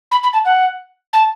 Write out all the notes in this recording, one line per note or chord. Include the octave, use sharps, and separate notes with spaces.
B5
B5
A5
F#5
A5